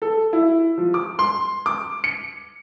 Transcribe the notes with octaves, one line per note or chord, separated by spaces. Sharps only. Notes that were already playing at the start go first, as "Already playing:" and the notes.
A4
E4
F3
D6
C6
D6
C#7